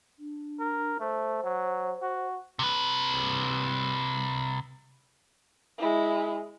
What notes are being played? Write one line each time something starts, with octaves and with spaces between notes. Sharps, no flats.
D4
A#4
A3 C5
F#3
F#4
C3 B4
G#3 E4